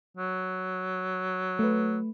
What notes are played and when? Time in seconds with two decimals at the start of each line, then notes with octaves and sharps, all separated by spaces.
0.17 F#3
1.59 A3 B4